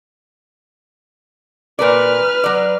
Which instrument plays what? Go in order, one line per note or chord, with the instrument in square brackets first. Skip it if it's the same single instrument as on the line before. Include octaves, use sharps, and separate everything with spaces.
[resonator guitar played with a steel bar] A#2 A#4 D5 [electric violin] B4 F6
[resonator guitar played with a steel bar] F#3 D5